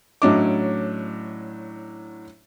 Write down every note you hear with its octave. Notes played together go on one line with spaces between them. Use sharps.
A2 F#3 C#4 D4 D#5 D6